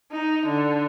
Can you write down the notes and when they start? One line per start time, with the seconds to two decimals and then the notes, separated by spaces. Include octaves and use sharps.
0.12 D#4
0.47 D3